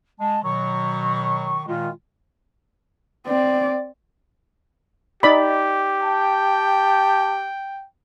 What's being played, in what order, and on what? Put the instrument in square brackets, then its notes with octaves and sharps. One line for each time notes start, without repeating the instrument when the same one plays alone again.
[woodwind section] G#3 [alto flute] A5
[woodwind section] B2 D#3 F#3 [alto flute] C#6
[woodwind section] A#2 D#3 G#3 [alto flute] F4
[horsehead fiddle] C4 D5
[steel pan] D#4 D5 B5 [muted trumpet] G4
[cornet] G5 [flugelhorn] A5